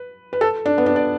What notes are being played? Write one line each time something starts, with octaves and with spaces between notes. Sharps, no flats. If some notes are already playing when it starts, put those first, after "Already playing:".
Already playing: B4
B4
A4
D4
B3
D4
D5